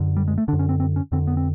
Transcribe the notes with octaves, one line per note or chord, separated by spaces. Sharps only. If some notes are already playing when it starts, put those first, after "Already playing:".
Already playing: F#2 D3
G3
G#3
A3
F#2 D3 D4
C#4
C4
C4
C#4
F2 D3 C4
B3
C4